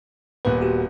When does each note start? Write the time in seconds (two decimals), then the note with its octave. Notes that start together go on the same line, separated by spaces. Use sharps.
0.45 D#1 A#2 B3 B4
0.62 F#4 G4